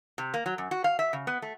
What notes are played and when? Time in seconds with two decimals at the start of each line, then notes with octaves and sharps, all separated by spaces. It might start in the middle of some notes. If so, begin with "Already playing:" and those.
0.18 C3
0.34 A#3
0.46 F#3
0.58 F#2
0.71 F#4
0.84 F5
0.99 E5
1.13 C#3
1.27 B3
1.42 A3